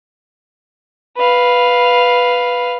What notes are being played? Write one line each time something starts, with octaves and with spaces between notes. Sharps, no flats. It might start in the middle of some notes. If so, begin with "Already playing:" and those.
B4 F5